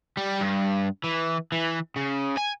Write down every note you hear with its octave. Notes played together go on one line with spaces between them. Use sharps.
G3
G2
E3
E3
C#3
G#5